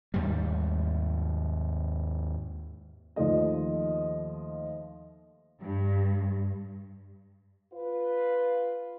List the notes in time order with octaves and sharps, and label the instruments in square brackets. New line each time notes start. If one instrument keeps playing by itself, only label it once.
[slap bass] D#2 G#2 G3
[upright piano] D#2 F3 A3 D#5
[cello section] G2
[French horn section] F4 B4